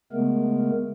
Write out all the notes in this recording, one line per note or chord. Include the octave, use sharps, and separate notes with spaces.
C#3 G#3 A3 B3 A#4